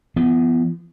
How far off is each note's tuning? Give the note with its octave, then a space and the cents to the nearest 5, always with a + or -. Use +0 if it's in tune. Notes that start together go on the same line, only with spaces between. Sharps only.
F3 -40 B3 +5